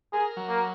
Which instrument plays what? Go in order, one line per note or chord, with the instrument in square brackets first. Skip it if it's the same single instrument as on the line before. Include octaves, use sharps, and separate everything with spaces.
[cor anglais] G#4 [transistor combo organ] A#4
[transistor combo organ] F#3
[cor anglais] A#3